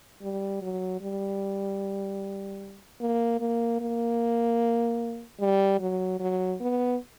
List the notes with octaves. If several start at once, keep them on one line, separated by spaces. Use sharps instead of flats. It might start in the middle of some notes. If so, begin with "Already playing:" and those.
G3
F#3
G3
A#3
A#3
A#3
G3
F#3
F#3
B3